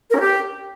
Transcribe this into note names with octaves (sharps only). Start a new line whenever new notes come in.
A#4
C#4
G4